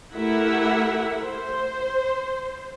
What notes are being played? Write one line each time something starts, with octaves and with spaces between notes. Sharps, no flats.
A3 E4 G4 A#4 E5 F#5
C5